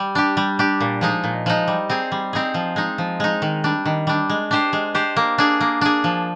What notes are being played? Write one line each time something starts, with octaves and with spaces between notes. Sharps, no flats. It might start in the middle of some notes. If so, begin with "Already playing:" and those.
Already playing: G3
D4 G4
G3
D4 G4
A#2
F3 G#3 D#4
A#2
F3 G#3 D#4
G3
C4 D#4 G#4
G3
C4 D#4 G#4
F3
G#3 D#4
F3
G#3 D#4
D#3
G3 D4
D#3
G3 D4
G#3
D4 G4 C5
G#3
D4 G4 C5
A#3
D4 G#4
A#3
D4 G#4
F3